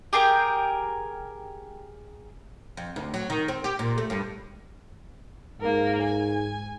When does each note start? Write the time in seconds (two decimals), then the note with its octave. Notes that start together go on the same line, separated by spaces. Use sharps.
0.13 G4 G#4 A#4 G5
2.77 F2
2.96 D2
3.14 F#3
3.30 D#3
3.48 C4
3.64 G4
3.79 A#2
3.98 A3
4.10 G2
5.61 G#2 A#3 A#4
6.03 G#5